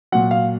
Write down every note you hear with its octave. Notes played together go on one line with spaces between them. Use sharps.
A#2 F#3 F#5
F5